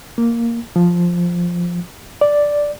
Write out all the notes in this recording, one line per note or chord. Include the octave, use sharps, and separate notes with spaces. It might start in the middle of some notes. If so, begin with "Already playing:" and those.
A#3
F3
D5